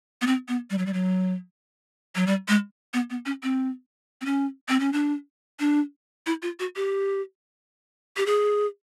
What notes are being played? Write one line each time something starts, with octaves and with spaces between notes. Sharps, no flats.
B3
C4
B3
G3
F#3
G3
F#3
F#3
G3
G#3
B3
B3
C#4
C4
C4
C#4
C4
C#4
D4
D4
E4
F4
F#4
G4
G4
G#4